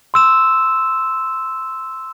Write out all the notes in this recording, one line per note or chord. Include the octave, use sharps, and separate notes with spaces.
C6 E6 E7